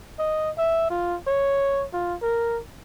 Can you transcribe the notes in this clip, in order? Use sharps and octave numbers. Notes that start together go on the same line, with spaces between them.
D#5
E5
F4
C#5
F4
A#4